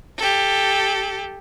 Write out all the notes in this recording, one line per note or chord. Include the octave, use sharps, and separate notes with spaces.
G4 A4